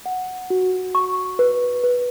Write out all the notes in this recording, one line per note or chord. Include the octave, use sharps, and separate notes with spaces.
F#5
F#4
C#6
B4
B4